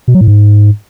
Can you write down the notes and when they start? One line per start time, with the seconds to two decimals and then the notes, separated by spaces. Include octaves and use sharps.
0.08 B2
0.14 F#3
0.21 A2
0.28 G#2